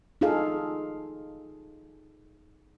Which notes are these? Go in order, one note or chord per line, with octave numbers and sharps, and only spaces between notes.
D#4 F4 G#4 A4 F5